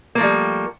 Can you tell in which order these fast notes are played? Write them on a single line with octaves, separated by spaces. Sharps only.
A#3 A3 F3 G3